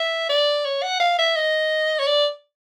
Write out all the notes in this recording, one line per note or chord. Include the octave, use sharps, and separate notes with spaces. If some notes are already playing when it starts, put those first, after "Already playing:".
Already playing: E5
D5
C#5
F#5
F5
E5
D#5
C#5
D5